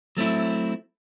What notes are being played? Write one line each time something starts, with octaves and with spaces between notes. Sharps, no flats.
F#3 A3 C4 E4